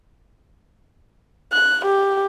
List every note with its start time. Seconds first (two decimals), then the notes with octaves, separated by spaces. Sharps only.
1.53 F#6
1.85 G4